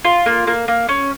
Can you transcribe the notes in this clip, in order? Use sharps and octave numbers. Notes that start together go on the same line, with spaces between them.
F4
A#3
A#3
A#3
C#4